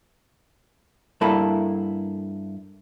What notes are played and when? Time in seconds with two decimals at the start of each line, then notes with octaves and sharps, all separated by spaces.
1.21 G2 A#3 E4 A4 B5